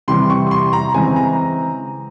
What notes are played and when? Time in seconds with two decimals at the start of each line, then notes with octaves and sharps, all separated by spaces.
0.08 C3 E3 G3 C6
0.30 C#6
0.47 C#6
0.51 C6
0.73 A#5
0.94 C#3 E3 G#3 C4 G#5
1.16 A#5